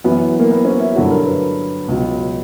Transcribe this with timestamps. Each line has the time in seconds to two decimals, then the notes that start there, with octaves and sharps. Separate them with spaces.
0.04 F#2 E3 B3
0.40 A#3
0.51 B3
0.65 C#4
0.80 E4
0.95 G2 D3 F#3 F#4
1.11 A#4
1.26 B4
1.88 C#2 B2 F#3